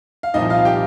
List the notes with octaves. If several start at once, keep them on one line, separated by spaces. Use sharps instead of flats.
F5
C2 A#2 F3 D#4 D#5
F4 F5
G4 G5